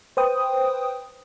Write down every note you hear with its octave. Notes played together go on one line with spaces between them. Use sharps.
B4 C5 G5 D#6